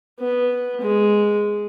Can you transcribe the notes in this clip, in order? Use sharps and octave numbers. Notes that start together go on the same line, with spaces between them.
B3
G#3